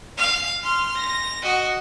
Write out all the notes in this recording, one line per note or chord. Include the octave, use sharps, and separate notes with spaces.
F5
C6 F6
A#6
F#4 D#5